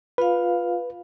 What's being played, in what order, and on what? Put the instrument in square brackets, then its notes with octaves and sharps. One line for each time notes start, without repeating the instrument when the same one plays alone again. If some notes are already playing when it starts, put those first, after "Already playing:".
[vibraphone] F4 F5 [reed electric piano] B4